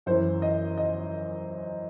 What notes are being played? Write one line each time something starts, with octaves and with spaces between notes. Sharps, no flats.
F#2 E3 C5
D#5
D#5